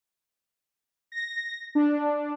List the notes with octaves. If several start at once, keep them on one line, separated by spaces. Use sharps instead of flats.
A#6
D4